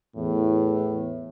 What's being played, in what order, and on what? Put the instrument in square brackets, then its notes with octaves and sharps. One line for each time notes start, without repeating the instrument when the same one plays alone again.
[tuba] E2 [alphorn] A2